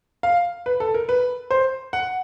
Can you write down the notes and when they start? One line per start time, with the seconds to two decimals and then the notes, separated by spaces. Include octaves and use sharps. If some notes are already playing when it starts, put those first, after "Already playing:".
0.23 F5
0.66 B4
0.80 A4
0.94 A#4
1.09 B4
1.51 C5
1.93 F#5